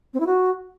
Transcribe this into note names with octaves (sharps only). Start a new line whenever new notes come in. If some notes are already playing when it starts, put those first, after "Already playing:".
C4
E4
F#4